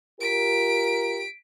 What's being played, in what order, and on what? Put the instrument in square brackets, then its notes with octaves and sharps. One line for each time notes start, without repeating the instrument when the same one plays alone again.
[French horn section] F4 G4 A#4 [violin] B6 D7